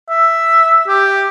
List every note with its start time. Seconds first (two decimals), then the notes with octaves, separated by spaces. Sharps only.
0.10 E5
0.88 G4